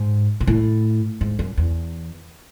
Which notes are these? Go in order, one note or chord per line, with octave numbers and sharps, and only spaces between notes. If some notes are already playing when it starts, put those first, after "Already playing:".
Already playing: G#2
A#2
A2
G#2
F#2
E2